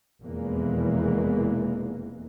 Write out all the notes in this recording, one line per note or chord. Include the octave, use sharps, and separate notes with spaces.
F1 E2 B2 E3 G#3 A#3